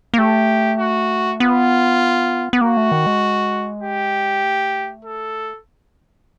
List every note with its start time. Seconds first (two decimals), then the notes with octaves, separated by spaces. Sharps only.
0.14 A#3
0.18 A3 G4
0.79 F#4
1.40 B3 F4
2.53 B3
2.61 A#3 F#4
2.77 A3
2.92 D#3
3.06 G#3
3.83 G4
4.44 A3
5.05 A4